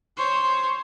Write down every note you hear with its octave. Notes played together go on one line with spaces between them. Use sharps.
C5 C#5